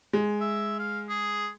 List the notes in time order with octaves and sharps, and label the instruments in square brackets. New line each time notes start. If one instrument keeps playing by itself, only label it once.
[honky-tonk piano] G#3
[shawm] E5
F5
G#4